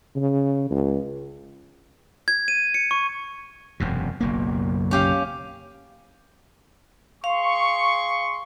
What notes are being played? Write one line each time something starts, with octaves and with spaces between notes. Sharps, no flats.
C#3
C#2
G#6
D#7
C#7
C#6
E1 F#2 C3
F#1 B1 A#3
C#4 G4 F5
G#4 F5 C6 C#6